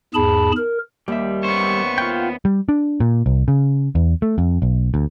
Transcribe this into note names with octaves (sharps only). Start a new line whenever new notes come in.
E2 G#2 G#4 A5 B5
A#4
D#2 G3 E5
B3 C#4 C5 C#6
F4 F#5 G5
G3
D4
A#2
C2
C#3
E2
A3
F2
B1
D2